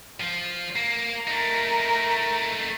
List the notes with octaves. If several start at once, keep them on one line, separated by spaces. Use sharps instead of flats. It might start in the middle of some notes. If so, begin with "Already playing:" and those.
F3
A#3
A3 D#4 A#4